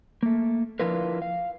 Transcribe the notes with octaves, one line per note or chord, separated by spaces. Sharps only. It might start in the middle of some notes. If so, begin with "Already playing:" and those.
A3 A#3
F3 D4 E4 F4 A#4 B4
F5